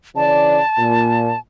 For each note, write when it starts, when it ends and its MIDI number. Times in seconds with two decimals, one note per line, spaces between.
0.16 0.59 49
0.16 0.59 52
0.16 0.59 74
0.16 1.39 81
0.78 1.31 46